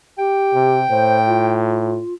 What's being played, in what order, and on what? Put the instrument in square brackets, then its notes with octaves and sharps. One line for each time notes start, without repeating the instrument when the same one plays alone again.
[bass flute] G4 [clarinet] G5
[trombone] C3
[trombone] A2 [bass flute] C5
[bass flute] F4